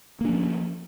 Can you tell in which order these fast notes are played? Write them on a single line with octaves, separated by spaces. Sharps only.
A#3 D4 F3 C#4